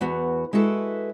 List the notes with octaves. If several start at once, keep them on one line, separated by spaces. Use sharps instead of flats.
E2 B3 F#4
G#3 E4 F#4 A4 B4